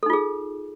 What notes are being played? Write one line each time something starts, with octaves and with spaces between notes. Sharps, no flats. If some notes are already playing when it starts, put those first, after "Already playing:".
D#4 F4 G#4 A4